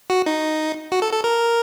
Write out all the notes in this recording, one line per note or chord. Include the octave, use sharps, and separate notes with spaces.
F#4
D#4
F#4
A4
A4
A#4